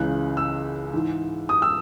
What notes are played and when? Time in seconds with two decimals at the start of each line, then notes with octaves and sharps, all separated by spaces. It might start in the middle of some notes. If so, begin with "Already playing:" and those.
Already playing: C#2 C#3 E3 F#6
0.37 E6
0.93 G#2 E3
1.49 D#6
1.62 E6